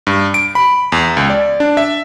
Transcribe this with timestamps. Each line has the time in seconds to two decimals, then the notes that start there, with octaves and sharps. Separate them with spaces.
0.07 G2
0.34 D7
0.55 B5
0.92 E2
1.17 C#2
1.30 D5
1.60 D4
1.77 E5